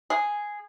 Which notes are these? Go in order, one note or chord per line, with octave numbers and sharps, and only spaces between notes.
G#4